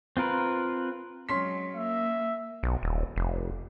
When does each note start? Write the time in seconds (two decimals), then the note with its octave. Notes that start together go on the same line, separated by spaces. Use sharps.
0.17 C4 F4 A#4 B4
1.29 F#3 G#3 C#4 C6 B6
1.76 A#3 E5
2.63 B1
2.83 D#1
3.16 F1